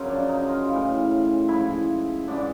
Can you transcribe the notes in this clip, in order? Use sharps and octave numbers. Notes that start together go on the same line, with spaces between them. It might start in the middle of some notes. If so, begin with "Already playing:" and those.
Already playing: F#2 C#3 F3
D4
D#4
F4
A2 E3
G#2 F3 E4
G#2 E3 D4